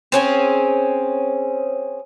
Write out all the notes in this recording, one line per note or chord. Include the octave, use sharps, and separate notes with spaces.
C4 C#4 G#4